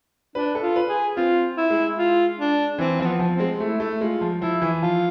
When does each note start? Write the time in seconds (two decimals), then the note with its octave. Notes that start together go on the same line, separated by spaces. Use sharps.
0.35 D4 B4
0.55 A4
0.62 F4
0.76 B4
0.89 G#4
1.16 C4 F4
1.57 E4
1.70 G#3
1.98 F4
2.38 D4
2.78 E3 C4
2.99 F3 C4
3.06 B3
3.19 F3
3.32 C4
3.40 G#3
3.60 A3 E4
3.80 A3
4.01 G#3 F4
4.21 F3
4.41 F3 E4
4.62 E3
4.82 F3 F4